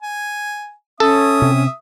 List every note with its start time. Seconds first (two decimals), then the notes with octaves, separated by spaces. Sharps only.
0.02 G#5
1.00 C#4 A4 E5 D#6
1.42 C3